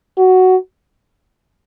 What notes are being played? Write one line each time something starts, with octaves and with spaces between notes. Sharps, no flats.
F#4